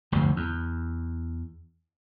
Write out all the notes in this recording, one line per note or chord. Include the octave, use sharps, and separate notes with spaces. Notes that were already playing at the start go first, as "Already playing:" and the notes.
F1 D2 G2 C3
E2